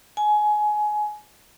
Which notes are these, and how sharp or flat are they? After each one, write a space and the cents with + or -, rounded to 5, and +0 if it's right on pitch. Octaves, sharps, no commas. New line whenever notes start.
G#5 +20